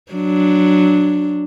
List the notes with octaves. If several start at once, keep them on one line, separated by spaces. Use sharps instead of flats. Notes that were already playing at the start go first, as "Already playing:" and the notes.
F#3 D4